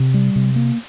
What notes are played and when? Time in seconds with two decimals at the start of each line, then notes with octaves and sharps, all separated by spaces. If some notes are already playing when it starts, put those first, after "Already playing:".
Already playing: C3
0.14 G3
0.36 C3
0.56 A#3